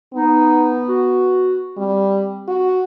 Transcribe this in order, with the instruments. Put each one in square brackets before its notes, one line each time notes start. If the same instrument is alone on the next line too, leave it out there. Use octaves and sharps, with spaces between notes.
[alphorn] B3 [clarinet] D#4
[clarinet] F#4
[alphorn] G3 [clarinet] C4
[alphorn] F#4